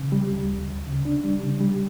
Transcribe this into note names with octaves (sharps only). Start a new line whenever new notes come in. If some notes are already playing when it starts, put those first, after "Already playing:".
Already playing: C#3
G3
D2
D2
D2
C#3
D4
G3
C#3
G3